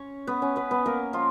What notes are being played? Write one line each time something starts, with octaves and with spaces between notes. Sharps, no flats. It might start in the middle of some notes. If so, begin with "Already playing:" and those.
Already playing: C#4 C#5
B3 B4
C#4 C#5
B3 B4
B3 B4
A#3 A#4
F3 F4